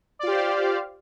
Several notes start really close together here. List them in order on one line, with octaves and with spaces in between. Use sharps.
D5 F4 G4 C5 F5